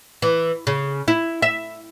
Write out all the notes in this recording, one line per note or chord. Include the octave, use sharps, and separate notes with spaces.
E3
C#3
E4
E5